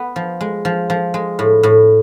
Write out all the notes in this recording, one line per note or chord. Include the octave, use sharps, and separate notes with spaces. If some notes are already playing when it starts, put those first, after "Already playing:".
Already playing: B3
F3
G#3
F3
F3
G#3
A2
A2